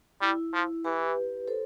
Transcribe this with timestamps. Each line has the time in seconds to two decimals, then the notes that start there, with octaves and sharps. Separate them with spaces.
0.21 G3 E4
0.53 F3
0.84 E3 G4 B4
1.48 A4 C5